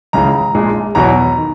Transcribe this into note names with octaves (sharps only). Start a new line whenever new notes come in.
C#2 C#3 E3 A#5
A#1 A#2 G#3
E2 B2 F#3 A#5
D#3